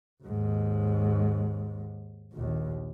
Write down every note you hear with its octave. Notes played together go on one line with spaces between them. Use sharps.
D#2 G#2
A#1 D#2